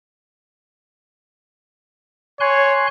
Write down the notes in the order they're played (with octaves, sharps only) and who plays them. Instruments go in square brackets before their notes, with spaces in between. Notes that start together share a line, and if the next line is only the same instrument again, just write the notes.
[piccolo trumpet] C#5 [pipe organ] G#5 C6 F#6